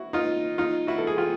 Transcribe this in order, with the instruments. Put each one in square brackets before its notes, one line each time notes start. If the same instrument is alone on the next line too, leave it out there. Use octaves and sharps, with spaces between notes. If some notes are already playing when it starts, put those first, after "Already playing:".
Already playing: [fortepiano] E4 F#4
D#4 F4
D#4 F4
E4 F#4
A4
G#4
F4 G4